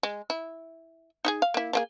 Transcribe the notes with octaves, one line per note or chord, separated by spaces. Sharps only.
G#3
E4
D#4 E4 G#4
F5
A#3 E4
F3 A#3 G#4